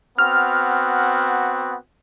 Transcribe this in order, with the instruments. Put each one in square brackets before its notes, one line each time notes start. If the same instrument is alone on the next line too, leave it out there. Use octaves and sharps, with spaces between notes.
[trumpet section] B3 C4 F#4 [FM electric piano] F6